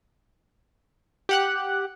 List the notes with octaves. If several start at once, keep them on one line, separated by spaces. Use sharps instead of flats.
G4 F#5 F#6